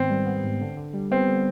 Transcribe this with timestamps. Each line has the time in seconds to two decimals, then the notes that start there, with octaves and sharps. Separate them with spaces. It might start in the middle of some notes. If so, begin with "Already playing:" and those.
Already playing: G#2 D#3 B3 C4
0.10 G3
0.26 B3
0.44 G#2
0.61 D3
0.77 D3
0.93 G3
1.11 B3 C4
1.28 D3